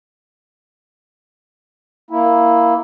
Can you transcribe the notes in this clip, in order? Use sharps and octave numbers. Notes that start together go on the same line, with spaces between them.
A#3 E4